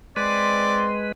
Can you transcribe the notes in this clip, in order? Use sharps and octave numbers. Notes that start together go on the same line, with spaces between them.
G#3 C4 B4 D5 C6